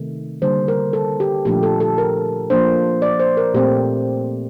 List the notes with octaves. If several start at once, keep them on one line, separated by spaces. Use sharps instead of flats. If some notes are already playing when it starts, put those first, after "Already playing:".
Already playing: C3 D#3 A3
D3 G3 A#3 C5
A#4
A4
G4
A#2 F3 A3 D4 G4
A4
A4
A#4
F3 A#3 D4 C5
D5
C5
A#4
A#2 A3 C4 G4